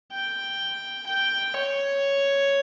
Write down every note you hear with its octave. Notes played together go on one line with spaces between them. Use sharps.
G5
G5
C#5